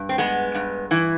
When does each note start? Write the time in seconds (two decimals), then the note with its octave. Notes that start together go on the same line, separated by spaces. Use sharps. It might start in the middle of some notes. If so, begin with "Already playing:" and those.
Already playing: G2
0.09 C4
0.18 G#3 B3
0.55 G2
0.91 E3 E4